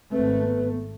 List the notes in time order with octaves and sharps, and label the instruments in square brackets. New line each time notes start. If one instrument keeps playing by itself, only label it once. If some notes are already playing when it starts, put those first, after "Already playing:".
[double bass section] G#1 A3 [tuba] C4 [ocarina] B4
[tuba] B3